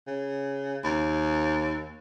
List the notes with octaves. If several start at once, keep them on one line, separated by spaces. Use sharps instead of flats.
C#3
D#2